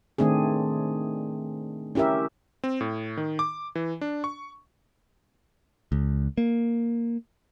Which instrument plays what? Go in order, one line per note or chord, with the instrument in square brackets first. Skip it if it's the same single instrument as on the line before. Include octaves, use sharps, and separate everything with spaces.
[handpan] D#3 A3 C4 D4 G#4
C#4 E4 G4 A#4 E5
[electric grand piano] C4
A2
D#3
D6
E3
D4
C#6
[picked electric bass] C#2
A#3